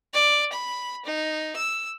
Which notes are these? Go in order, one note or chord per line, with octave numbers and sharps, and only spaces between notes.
D5
B5
D#4
E6